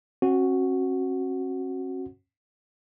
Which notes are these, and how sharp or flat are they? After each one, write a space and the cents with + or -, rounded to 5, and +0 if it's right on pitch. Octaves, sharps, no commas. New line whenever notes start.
C#4 -45 F#4 +0